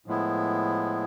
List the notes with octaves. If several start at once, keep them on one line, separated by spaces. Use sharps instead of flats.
A2 F3 G#3 B3 E4